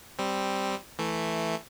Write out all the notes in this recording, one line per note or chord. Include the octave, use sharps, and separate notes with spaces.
G3 C4
E3 A3